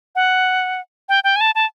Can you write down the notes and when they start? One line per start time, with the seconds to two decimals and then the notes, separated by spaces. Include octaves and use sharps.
0.15 F#5
1.09 G5
1.24 G5
1.36 G#5
1.41 A5
1.55 A5